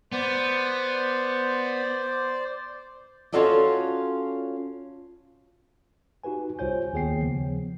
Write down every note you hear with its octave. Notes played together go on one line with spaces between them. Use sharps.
B3 C5 D5
C#4 F4 F#4 A4 D5 D#5
D#4 F#4 G4 B4 G#5
C2 F4 C5 C#5 G#5 G6
D#2 B3 G#4 C#5 G5 C7
C#3 F3 B3